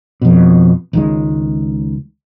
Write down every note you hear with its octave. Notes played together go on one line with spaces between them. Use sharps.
F2 B2
C#2 D#3 G#3